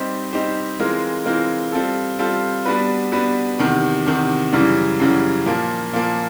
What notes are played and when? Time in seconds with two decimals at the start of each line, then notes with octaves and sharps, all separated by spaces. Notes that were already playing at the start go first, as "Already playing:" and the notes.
Already playing: G3 C4 D#4 G4 C5
0.32 G3 C4 D#4 G4 C5
0.79 E3 G#3 C4 F4 A#4
1.25 E3 G#3 C4 F4 A#4
1.72 G3 C4 F4 A4
2.19 G3 C4 F4 A4
2.65 G3 B3 D4 F#4 B4
3.12 G3 B3 D4 F#4 B4
3.59 E2 C3 D#3
4.06 E2 C3 D#3
4.53 F#2 C#3 E3 G3
5.00 F#2 C#3 E3 G3
5.46 A#2 F3 A#3
5.93 A#2 F3 A#3